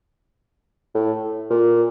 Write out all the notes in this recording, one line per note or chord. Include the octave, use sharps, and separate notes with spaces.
A2
A#2